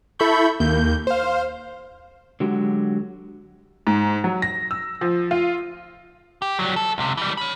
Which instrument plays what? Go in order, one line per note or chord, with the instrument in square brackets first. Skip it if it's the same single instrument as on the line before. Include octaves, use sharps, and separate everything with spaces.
[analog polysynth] E4 A4 E5 B5 C#6 G6
D#2 A#3 G6
C5 F5
[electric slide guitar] D3 F#3 G#3 F#4 G4
[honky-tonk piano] G#2
F#3
A#6
E6
F3
F4
[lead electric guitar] G4
F#3 G3
A4
C#2 C3
E3 G3
C#5 B5